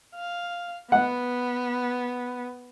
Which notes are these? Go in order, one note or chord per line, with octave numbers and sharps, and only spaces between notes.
F5
B3 F#5